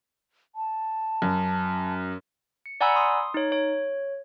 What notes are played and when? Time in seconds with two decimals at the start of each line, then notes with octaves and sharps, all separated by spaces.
0.55 A5
1.22 F#2
2.66 C#7
2.81 D5 F#5 G#5 A#5 B5 E6
2.96 C6 D#6
3.34 D#4 C#5
3.52 C#5